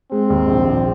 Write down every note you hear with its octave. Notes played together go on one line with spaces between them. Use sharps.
G#3 C4
D#2
A#1
A#1